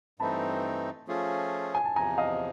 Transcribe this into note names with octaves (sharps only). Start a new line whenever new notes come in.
G2 E3 A3 C4 D#4 A5 B5
F3 A3 C#4 F4 G#4
G#5
A5
E2 C3 F3 G#5 A#5
D#5 F5